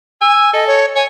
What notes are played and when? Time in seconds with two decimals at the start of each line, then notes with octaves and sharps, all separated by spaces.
0.21 G#5 E6
0.53 A4 D#5
0.67 C#5
0.96 C#5 G#5